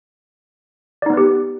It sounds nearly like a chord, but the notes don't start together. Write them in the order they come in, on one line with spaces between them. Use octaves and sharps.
D5 D#4 B3 B4 G4